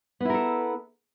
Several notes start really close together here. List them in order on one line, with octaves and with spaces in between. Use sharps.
B3 E4 A#4 A4